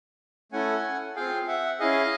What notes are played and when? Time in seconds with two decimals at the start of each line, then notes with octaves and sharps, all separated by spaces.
0.52 A3 C#4 E4 A4 F#5 G#5
1.16 C4 F4 G#4 F5 G5
1.47 E5 F#5
1.80 C#4 E4 G#4 D#5 F5